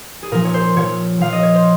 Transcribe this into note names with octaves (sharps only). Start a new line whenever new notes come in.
G#4
A#2 F3 A#4
C#5
C5
A#2 F3 C#5
A#2 F3 F5
D#5
C#5
C5